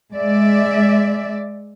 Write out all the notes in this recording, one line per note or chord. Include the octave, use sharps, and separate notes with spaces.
G#3 D5 E5